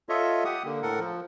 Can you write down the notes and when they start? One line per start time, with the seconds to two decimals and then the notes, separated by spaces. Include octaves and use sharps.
0.09 F4 A4 C#5 D#5 E5
0.45 G4 F#5 D#6
0.65 D3 A#3
0.82 A2 A4 A#4 F#5
1.00 F3